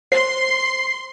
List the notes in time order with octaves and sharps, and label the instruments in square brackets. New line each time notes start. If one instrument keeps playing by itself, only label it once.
[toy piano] C5 [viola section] C6 [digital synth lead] C7